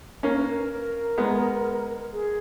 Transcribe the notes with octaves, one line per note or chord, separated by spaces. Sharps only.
A#3 C#4 A#4
B4
A#4
G#3 B3
G#4